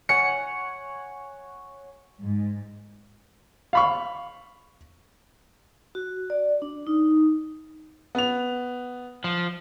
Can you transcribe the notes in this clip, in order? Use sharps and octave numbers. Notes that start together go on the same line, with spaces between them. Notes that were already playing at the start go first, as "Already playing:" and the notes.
C#5 F#5 G#5 C#7
G#2
F5 B5 C#6
F#4
D5
D4
D#4
B3 F7
F3